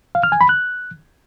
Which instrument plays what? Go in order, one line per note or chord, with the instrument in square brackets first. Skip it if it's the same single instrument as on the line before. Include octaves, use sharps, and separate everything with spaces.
[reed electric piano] F5
F6
G#5
B5
F#6